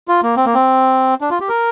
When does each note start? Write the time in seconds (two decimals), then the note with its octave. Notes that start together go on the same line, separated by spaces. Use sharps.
0.08 F4
0.22 A#3
0.36 C4
0.46 A#3
0.54 C4
1.21 D4
1.30 F4
1.40 G4
1.49 A#4